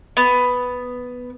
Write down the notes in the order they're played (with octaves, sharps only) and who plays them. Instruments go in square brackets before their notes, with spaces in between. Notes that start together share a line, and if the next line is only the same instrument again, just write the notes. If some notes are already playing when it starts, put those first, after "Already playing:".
[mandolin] B3